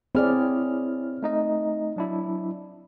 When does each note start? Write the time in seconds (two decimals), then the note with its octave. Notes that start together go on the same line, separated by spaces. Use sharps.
0.15 C4 E4 G#4 C#5 D5 F6
1.22 A3 D#4 D#5
1.96 F#3 D4 E4